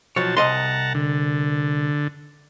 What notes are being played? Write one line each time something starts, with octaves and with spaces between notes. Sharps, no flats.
B1 F3 F#4 C#5 A5
C2 D#5 F#5 A5 A#5 C6
D3